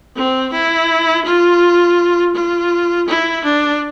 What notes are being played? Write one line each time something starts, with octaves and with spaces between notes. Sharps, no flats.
C4
E4
F4
F4
E4
D4